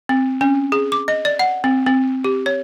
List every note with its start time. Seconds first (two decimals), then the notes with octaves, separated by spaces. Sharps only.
0.09 C4
0.41 C#4
0.72 G#4
0.92 D6
1.08 D#5
1.25 D5
1.39 F#5
1.64 C4
1.86 C4
2.24 G4
2.46 C#5